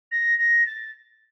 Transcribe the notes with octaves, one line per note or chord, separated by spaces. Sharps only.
A#6
A#6
A6